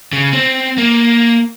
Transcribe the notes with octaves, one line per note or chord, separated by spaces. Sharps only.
C#3
C4
A#3